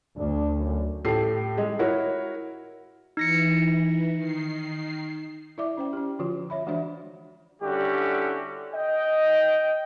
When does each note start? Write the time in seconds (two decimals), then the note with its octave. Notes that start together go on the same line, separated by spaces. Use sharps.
0.17 D2 D4
0.59 F#2
1.05 A2 G4 A4 C7
1.57 G#3 G#4
1.79 E4 F#4 A#4 C#5
3.17 E3 D#4 A#6 C#7
4.15 D#3 C7
5.58 E4 D5 E5 D6
5.77 C#4 C5 G5
5.93 C#4 G4
6.19 D3 F3 F4 F#4
6.50 C#5 E5 B5
6.66 E3 G#3 D4 F#4 C5 E5
7.62 D3 G3 C#4 E4 F#4 G4
8.74 D#5 G5